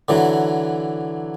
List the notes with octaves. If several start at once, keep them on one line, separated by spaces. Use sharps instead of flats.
D3 E3 F#3